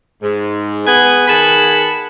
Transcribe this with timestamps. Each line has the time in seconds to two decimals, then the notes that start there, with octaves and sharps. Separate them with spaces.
0.22 G#2
0.86 B3 G#4 B4 G#5
1.27 D#3 G#4 F#5 A5 B5